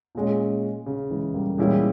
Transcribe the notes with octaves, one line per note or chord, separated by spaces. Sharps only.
A#2 G#3 C#4
C#3
E3 G#3
G3 A#3
A#2 E3 G3 G#3 C#4 E4